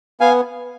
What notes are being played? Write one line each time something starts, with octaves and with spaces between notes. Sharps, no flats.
B3 F5 G#5